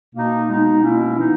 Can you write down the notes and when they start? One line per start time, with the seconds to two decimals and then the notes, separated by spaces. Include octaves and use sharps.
0.14 B2 A#3 D#4
0.47 B2 G#3 B3 D#4
0.82 B2 A#3 C#4 E4
1.18 E3 B3 D#4